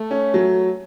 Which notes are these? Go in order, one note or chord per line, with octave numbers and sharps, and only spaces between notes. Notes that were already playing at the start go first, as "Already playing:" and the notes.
Already playing: A3
C#4
F#3